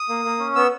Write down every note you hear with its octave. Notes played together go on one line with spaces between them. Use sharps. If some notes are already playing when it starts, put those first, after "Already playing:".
Already playing: D#6
A#3
A#3
C#4
B3 E6